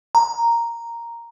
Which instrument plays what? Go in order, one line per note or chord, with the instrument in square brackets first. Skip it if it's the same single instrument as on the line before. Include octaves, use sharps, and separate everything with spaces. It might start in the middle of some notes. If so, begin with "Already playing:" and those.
[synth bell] A#5